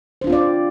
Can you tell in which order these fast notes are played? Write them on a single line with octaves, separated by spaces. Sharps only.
C5 D4 F4 C4 D5